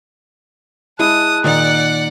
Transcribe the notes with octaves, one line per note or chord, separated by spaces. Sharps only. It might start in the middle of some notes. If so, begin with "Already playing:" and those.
G#3 E4 A5 D#6 F#6
A#2 D#3 D#4 D5 F#5